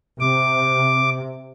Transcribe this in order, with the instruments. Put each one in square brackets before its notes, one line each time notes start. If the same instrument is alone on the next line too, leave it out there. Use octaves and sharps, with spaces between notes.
[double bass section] C3 [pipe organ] D6